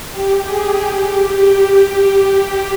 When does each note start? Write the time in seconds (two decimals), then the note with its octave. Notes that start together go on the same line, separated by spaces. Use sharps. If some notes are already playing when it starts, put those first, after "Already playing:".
0.12 G4
0.45 G#4
0.79 G4
1.47 G4